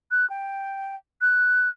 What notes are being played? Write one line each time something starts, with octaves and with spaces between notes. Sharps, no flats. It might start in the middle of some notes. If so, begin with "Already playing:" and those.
F#6
G5
F#6